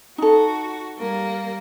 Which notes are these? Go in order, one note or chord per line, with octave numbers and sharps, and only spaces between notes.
D#4 F#4 A4
G3 A#3